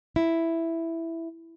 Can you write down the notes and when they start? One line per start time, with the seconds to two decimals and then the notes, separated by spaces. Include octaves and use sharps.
0.16 E4